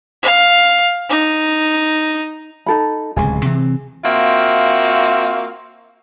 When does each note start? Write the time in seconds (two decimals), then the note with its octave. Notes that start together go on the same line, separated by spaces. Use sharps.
0.23 F5
1.10 D#4
2.66 D#4 A4 B5
3.16 D1 C#2 C3 G#4 G#5
3.45 C3 E3 C4
4.04 A#3 C4 F4 F#4 E5 F5